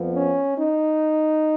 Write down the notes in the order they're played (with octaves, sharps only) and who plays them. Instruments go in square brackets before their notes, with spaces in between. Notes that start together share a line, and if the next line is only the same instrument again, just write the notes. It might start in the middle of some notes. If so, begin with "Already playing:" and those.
Already playing: [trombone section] F2 F3 B3
C#4
D#4